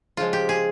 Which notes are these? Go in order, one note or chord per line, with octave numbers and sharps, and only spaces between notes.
C#3 F3 G#3 F4
G4
G#4